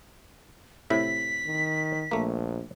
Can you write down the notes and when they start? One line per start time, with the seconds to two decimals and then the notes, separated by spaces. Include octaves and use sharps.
0.90 A2 C3 E4 B6
1.46 D#3
2.11 A#1 A3 A#3